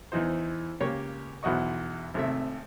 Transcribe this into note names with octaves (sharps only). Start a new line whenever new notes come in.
E2 E3 D#4 C5
C#2 A#3 G4 C#5 C#6
B1 E2 F#4 D#5 C#6
G#1 C3 A3 E5